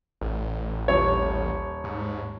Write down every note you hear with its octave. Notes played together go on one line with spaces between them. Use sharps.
A1
D#1 C#5
G#2